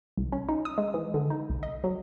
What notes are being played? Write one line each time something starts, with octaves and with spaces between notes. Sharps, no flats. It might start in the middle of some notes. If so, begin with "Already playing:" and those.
C2
C#4
D#4
D#6
G#3
E3
D3
D#4
C2
D#5
F#3